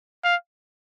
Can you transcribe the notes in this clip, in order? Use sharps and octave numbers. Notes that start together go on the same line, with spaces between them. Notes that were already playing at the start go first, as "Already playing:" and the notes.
F5